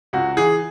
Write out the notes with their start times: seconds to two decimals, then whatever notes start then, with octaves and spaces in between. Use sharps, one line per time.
0.13 C#2 F#4
0.37 E3 G#4